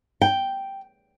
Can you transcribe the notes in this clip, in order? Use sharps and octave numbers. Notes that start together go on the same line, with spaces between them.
G5